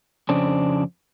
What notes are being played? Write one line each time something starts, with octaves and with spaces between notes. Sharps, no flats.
F2 C#3 C4 D4